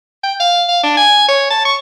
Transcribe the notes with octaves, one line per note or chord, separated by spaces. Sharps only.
G5
F5
F5
D4
G#5
C#5
A5
C#6